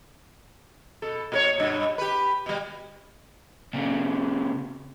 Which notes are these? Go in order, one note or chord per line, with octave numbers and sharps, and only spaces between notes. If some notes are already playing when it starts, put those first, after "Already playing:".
B2 A4
A#2 A#4 C#5
G2 B2
G4 B4
B2 G3
A#2 C#3